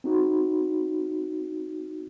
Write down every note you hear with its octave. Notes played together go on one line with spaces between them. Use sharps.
C4 D#4 F#4